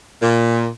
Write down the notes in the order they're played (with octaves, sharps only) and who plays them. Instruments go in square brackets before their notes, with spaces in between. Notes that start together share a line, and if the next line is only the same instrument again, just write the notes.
[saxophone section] A#2